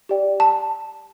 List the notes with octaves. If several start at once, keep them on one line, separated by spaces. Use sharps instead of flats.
G4 D5 G5
A5